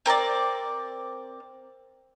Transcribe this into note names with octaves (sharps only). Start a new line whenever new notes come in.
C4 A#4 C#5 D5